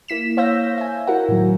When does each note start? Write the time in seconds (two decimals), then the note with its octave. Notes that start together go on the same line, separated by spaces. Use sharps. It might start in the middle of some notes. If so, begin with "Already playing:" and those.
0.08 A#3 E4 B6 E7
0.37 C5 C#5 F5 E6 G6 A#6
0.78 E5 G#5
1.07 E4 F#4 A#4 F#5
1.29 A2 D#3 F#3